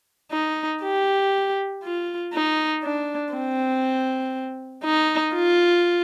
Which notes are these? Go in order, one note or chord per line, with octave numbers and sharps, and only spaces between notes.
D#4
G4
F4
D#4
D4
C4
D#4
F4